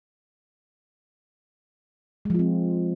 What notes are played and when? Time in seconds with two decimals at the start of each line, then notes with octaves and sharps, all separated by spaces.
2.25 G#3
2.30 F3
2.35 F4
2.39 C4